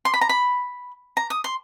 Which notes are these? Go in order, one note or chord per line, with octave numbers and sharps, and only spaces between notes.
C6
B5
A#5
B5
A#5
D#6
C6